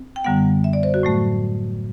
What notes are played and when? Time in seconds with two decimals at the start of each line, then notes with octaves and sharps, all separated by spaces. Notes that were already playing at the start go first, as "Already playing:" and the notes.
Already playing: C4
0.16 G5
0.24 F#2 D3 G3 B3 F#5
0.64 E5
0.73 D5
0.83 C5
0.94 F#4
1.03 A2 F#3 A3